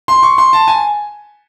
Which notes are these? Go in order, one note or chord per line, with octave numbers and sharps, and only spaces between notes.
C6
C#6
C6
A5
G#5